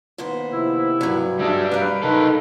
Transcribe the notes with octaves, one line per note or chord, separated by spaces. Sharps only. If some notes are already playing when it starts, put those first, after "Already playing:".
D#2 B3 C5
C3 F3 E4
G2 F#3
G3 D4 G#4 D#5 E5
A#4 B4 F5
D#4 A4